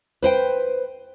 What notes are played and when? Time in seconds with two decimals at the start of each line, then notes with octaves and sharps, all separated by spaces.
0.22 B4 C5 G5